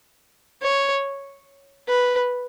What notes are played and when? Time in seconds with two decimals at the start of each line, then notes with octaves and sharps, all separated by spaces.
0.62 C#5
1.88 B4